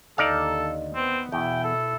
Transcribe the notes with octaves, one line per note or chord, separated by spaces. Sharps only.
D#2 D3 D#4 A4 D5 F5
B3 C4
E2 B2 E4 G5
A4